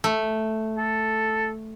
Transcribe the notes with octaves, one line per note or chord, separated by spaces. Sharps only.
A3
A4